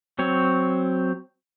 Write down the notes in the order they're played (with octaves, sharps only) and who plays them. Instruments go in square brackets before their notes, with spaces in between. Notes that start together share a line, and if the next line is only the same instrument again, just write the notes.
[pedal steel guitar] F#3 C4 C#5